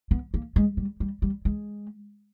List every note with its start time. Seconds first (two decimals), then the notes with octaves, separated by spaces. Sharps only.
0.11 B3
0.34 A#3
0.56 G#3
0.77 G3
1.00 G3
1.22 G3
1.45 G#3